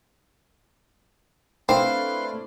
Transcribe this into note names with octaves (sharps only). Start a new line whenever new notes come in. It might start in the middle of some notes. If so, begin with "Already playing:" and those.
A3 C4 D4 E4 B4 F5 C6